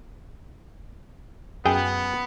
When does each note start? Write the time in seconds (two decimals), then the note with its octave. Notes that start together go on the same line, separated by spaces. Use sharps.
1.65 F#2 B3 G#4 G5